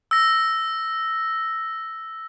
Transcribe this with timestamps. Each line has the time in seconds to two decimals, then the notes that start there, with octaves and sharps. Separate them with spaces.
0.11 E6 A#6